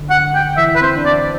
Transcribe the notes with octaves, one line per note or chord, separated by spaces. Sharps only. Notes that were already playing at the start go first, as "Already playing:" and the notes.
Already playing: D3
F#5
G5
E3 E5
B4
C4 C5
D4
C4 D5